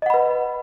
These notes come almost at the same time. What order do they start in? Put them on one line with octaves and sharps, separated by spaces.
D#5 F#5 B5 B4